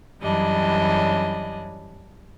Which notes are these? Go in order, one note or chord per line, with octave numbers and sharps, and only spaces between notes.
F#2 E3 F#3 G3 D4 D#5